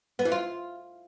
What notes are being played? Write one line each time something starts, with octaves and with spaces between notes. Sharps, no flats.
B3
E3
F4